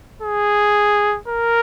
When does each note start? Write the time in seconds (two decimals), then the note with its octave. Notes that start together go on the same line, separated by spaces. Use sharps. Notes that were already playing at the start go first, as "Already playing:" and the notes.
0.22 G#4
1.28 A#4